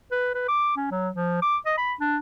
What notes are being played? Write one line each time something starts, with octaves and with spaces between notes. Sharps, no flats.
B4
B4
D6
C#4
F#3
F3
D6
D#5
B5
D4